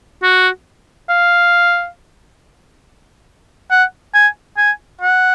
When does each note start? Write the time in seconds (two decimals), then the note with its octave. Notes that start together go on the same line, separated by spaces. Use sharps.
0.23 F#4
1.09 F5
3.71 F#5
4.14 G#5
4.58 G#5
5.01 F#5